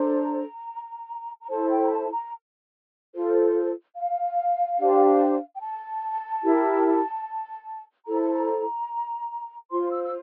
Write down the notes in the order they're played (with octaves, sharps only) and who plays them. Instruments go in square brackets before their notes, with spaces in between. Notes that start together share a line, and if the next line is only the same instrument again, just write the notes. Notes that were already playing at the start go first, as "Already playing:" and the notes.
Already playing: [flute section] D4 A4 C5 A#5
A#5
E4 A4 C5 A5
G5
A#5
A5
A#5
F4 A4 C5
F5
D4 G4 C5
G5
A5
E4 G4 A#4
E4 A4 C5 A#5
A5
A#5
F4 C5 C6
E6
E6